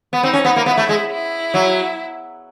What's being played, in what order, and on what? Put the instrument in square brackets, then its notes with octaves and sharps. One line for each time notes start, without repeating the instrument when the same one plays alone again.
[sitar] B3
[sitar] C4 [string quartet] D#4
[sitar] C#4
B3
A#3
[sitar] B3 [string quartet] E4
[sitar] A3
G#3
[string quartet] E4
[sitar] F#3